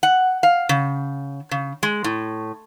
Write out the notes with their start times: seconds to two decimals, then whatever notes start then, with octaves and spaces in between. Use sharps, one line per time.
0.03 F#5
0.43 F5
0.69 C#3
1.51 C#3
1.83 G#3
2.04 A2